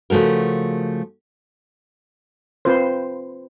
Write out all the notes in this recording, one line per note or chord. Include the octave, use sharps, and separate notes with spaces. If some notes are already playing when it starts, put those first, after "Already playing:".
C#3 F3 A3 F#4 A#4
C4 F4 B4 C5